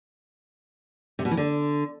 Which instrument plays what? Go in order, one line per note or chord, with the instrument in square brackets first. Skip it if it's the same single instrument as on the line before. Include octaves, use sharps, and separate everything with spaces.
[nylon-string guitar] C3
B2
E3
D3